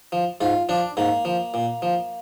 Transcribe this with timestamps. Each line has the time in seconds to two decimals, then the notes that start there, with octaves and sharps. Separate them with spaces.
0.12 F3
0.41 G#2 F4
0.69 F3 D4
0.97 G#2 A#3
1.25 F3
1.54 A#2
1.82 F3